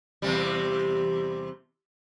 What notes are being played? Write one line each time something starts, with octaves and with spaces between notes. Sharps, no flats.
E2 C3 G3